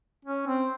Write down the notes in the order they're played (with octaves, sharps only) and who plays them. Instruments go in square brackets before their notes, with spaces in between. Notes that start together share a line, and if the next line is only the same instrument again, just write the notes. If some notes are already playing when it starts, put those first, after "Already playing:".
[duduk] C#4
C4